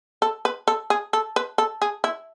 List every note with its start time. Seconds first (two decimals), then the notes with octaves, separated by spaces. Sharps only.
0.22 A4
0.45 B4
0.67 A4
0.90 G#4
1.13 A4
1.36 B4
1.58 A4
1.82 G#4
2.04 E4